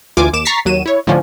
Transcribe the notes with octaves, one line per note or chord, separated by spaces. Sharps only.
D2 E3 F4 G#5 D6
D#2 D6 E7
A#5 C#6 A6 B6 C7
D#2 F#3 D#7 E7
E4 C#5
A2 D3 F3 C#4 D4